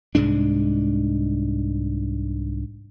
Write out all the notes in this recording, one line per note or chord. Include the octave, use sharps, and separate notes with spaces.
C2 G#2 G#3 D4